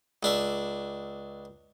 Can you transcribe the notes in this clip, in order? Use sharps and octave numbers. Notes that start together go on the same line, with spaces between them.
C#2 D4 E5